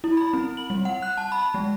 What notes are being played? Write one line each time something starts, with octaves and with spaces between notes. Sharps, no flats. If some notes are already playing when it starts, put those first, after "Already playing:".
E4
B5
C4
F#7
G3
F#5
F#6
A5
B5
G#3